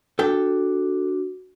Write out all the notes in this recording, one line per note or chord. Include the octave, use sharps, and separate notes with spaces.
D4 F#4 A4 G5